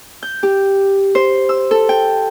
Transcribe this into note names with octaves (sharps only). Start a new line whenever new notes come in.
G6
G4
C5
E6
A4
G5